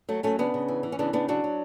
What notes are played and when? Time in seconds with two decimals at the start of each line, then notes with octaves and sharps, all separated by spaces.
0.09 F#3 A3
0.23 F#3 A3 C#4
0.39 C#3 B3 D4
0.54 C#3
0.68 E3
0.83 E3
0.92 C#4
0.99 C#3 B3 D4
1.13 C#3 B3 D4
1.28 F#3 D4 F#4
1.44 F#3